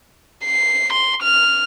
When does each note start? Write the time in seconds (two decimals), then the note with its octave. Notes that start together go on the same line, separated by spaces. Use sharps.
0.45 C7
0.93 C6
1.22 F6